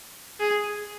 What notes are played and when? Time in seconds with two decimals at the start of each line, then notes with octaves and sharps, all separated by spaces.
0.40 G#4